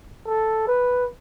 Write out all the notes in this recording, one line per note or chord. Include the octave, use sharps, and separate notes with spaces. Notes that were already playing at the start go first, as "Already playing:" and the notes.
A4
B4